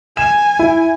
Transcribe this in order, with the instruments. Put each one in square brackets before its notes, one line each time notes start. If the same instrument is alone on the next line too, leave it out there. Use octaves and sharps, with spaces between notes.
[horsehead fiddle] G#5 [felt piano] E7
[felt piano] E4